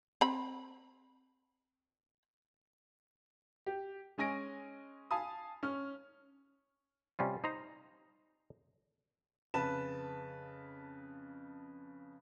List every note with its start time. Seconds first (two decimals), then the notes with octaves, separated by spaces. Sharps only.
0.21 C4 B5
3.66 G4
4.18 G#3 C#4 G#5 A#6 D7
5.11 F5 G#5 A5 B5 D#6
5.63 C#4 F6
7.19 C3 G3 C#4 F4
7.44 D#4 C5 A#5
9.54 F2 C#3 B4 A5 E7